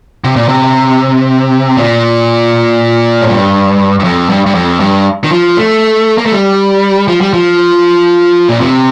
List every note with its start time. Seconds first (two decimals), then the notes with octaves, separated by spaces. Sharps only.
0.24 C3
0.36 A#2
0.49 C3
1.77 A#2
3.22 A2
3.29 G2
4.00 G2
4.04 F2
4.30 G2
4.46 G2
4.55 F2
4.80 G2
5.24 D#3
5.31 F3
5.57 A3
6.18 A#3
6.26 A3
6.32 G3
7.08 F3
7.21 G3
7.34 F3
8.49 A#2
8.61 C3